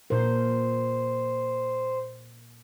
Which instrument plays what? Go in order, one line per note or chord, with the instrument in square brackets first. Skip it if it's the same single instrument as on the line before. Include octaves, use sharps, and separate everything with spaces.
[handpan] A#2 A#4 [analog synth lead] C5